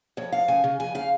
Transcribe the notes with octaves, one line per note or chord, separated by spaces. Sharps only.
F2 C#5
F2 F5
C#3 G#5
C#3
F2 G#5
C#3 F5